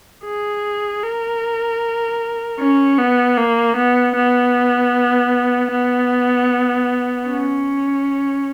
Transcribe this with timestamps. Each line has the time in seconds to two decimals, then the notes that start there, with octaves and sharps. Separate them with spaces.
0.25 G#4
1.03 A#4
2.59 C#4
2.98 B3
3.38 A#3
3.76 B3
4.15 B3
5.72 B3
7.28 C#4